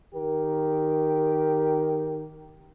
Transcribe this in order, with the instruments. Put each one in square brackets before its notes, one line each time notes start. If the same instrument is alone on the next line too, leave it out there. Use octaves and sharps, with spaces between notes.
[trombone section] D#3 G4 A#4